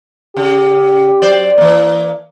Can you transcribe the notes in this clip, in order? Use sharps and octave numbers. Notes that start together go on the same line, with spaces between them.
C#3 G4
F#3 C5 D5
E3 A#3